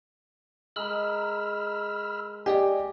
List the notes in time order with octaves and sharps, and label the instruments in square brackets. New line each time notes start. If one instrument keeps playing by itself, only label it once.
[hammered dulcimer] G#3 A#4 [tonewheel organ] B5 E6 F6
[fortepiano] G4 [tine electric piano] D5 D#5 G#5